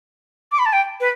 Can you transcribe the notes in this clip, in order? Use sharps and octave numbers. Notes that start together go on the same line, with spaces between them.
D6
B5
A5
G5
B4